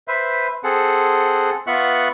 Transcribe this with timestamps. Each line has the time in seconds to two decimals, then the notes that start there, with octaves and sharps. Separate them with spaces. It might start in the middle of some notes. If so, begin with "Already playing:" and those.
0.08 B4 C5 E5
0.64 C4 G#4 A4 F#5
1.67 B3 F4 E5 F#5 C#6 F#6